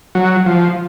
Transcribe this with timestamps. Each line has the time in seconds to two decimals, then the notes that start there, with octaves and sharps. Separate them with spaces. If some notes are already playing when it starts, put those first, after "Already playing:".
0.15 F#3
0.46 F3